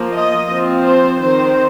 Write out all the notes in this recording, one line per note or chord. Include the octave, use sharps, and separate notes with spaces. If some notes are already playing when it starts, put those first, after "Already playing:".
Already playing: F3 A#3
D#5
F3 C4
C5
D#3 C4 C5